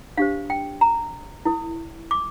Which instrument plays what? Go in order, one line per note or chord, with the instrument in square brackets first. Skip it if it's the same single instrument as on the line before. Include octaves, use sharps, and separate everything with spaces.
[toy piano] D4 G4 C5 F5
G5
A#5
E4 A#4
D6